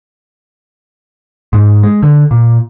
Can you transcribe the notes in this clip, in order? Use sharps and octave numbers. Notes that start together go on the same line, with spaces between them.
G#2
G#3
D3
A#2